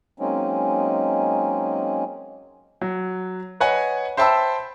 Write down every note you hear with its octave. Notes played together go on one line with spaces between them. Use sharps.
F#3 G#3 A#3 C4 C#4 D#4
F#3
B4 C#5 D#5 F#5 G#5
C5 E5 G5 A5 B5 E6